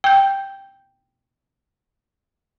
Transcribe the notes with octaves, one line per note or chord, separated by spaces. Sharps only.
G5 G6